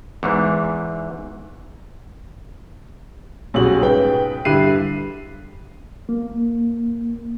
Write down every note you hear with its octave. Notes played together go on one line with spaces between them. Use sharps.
E2 G#2 E3
B1 C#3 G3 F#4 F#7
G#2 C#3 B4 G5
G2 D3 E4 F#6 C7 D#7
A#3